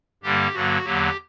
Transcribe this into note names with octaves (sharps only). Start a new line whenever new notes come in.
G2 D3 G3 A#3 G4
G2 D3 F#3 A#3 F#4
E2 D3 F#3 A#3 G4